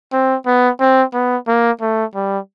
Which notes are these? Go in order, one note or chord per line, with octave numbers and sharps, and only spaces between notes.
C4
B3
C4
B3
A#3
A3
G3